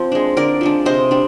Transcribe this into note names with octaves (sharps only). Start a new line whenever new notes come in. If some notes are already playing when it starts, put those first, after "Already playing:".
Already playing: F3 C4
G#3 D4
D3 A#4 D5
F3 G#3 D4
C3 C5 D#5
G3 D4